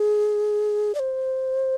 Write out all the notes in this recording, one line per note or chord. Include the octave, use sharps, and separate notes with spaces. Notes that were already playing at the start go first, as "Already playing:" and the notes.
Already playing: G#4
D5
C5